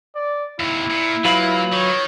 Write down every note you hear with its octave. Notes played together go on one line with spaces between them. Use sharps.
D5
D#2 C3 E4
A#2
F#3 A#3 F4 B4
D#3 C#5